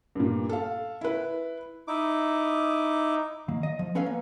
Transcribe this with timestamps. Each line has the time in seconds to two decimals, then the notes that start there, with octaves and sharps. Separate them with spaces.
0.15 G2 A#2
0.49 A4 F5
1.01 E4 B4
1.88 D#4 E4 D6
3.48 D#3 A#3
3.63 D#5
3.79 F3
3.95 B3 C#4 A4 B4 C#5 F5
4.06 A#3